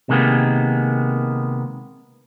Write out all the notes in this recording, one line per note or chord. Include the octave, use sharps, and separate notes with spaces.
C3 D#3 G#3 A#3 B3